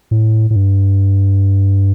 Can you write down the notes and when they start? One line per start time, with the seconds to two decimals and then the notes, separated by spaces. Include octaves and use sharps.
0.11 A2
0.50 A2
0.56 G2